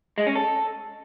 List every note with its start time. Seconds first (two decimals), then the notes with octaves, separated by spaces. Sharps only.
0.18 G#3
0.27 C#4
0.36 A4